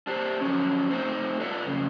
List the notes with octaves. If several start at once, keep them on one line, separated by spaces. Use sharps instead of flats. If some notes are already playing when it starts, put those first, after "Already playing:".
D4 G4 C5
D3 F3 F#3 C#4
A3 C4 D#4 C5
F4 A4 B4 D5 E5 F#5
F2 C#3